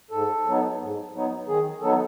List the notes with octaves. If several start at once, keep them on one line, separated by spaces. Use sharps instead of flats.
G#2 A4
F#3 B3 D#4
G#2
F#3 B3 D#4
D#3 G#4
F#3 B3 D#4 A4